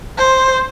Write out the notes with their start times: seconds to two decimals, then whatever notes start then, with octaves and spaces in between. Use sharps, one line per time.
0.18 C5